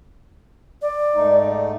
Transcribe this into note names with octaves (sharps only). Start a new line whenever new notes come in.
D5
G#2 A3 D#4